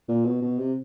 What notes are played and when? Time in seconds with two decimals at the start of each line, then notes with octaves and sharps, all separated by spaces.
0.09 A#2
0.25 B2
0.42 B2
0.59 C3